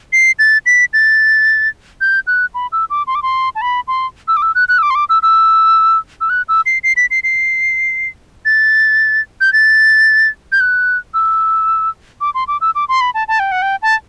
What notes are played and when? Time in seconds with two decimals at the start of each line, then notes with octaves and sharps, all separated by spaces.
0.13 C7
0.39 A6
0.66 B6
0.93 A6
2.01 G6
2.27 F#6
2.54 B5
2.72 E6
2.90 D6
3.07 C6
3.15 D6
3.22 C6
3.55 A5
3.62 B5
3.88 C6
4.28 E6
4.37 D6
4.42 E6
4.55 F#6
4.69 F#6
4.78 E6
4.82 D6
4.90 C6
4.95 D6
5.09 E6
5.23 E6
6.21 E6
6.30 F#6
6.48 E6
6.66 C7
6.83 C7
6.97 B6
7.11 C7
7.24 C7
8.45 A6
9.41 G6
9.53 A6
10.52 G6
10.60 F#6
11.14 E6
12.21 D6
12.34 C6
12.48 D6
12.61 E6
12.75 D6
12.89 C6
13.01 B5
13.14 A5
13.28 A5
13.39 G5
13.52 F#5
13.62 G5
13.82 A5